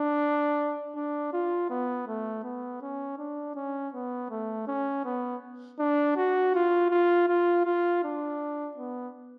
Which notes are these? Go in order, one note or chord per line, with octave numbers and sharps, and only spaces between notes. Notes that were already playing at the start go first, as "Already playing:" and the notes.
Already playing: D4
D4
F4
B3
A3
B3
C#4
D4
C#4
B3
A3
C#4
B3
D4
F#4
F4
F4
F4
F4
D4
B3